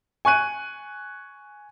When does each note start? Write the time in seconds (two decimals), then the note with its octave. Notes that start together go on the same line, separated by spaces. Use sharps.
0.25 G#5 C#6 F#6 D#7